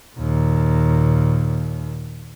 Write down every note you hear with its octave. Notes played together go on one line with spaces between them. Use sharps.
D#2 A#2